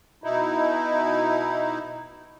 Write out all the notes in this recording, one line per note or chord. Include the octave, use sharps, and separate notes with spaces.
B2 D#4 E4